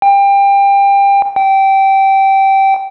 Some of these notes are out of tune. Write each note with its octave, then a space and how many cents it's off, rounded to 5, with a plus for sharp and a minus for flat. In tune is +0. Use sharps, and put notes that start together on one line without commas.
G5 +25
G5 -15